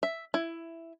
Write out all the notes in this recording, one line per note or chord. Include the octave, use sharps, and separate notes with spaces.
E5
E4